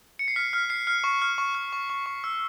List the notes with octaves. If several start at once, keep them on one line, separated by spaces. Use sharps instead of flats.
C#7
C7
F6 B6
F6 B6
F6 C7
F6
C#6
F6
C#6
F6
C#6
C#6
C#6
E6